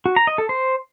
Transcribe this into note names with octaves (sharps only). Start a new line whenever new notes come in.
F#4
A#5
D#5
A4
C5